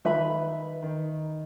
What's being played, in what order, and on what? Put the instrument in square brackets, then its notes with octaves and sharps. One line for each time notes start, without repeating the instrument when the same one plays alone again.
[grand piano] D#3 [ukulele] B4 E5 B5
[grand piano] D#3